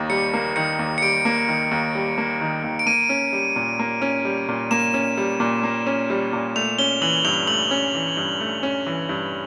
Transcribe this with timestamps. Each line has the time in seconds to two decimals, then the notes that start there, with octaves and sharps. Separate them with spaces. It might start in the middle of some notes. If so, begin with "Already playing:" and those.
Already playing: D#2 D#3 A#3
0.10 G3 C#7
0.33 A#3
0.56 D#3 C#7
0.79 D#2
0.98 C#7
1.02 G3 D7
1.25 A#3
1.48 D#3
1.71 D#2
1.95 G3
2.18 A#3
2.41 D#3
2.64 D#2
2.79 D7
2.86 A#3 D#7
3.09 C#4
3.33 G3
3.56 A#2
3.79 A#3
4.02 C#4
4.25 G3
4.48 A#2
4.71 A#3 E7
4.94 C#4
5.17 G3
5.40 A#2
5.63 A#3
5.86 C#4
6.10 G3
6.33 A#2
6.56 A3 F7
6.79 C#4 G7
7.02 E3 F#7
7.25 G2 F7
7.47 A3 F#7
7.71 C#4
7.95 E3
8.17 G2
8.40 A3
8.63 C#4
8.86 E3
9.09 G2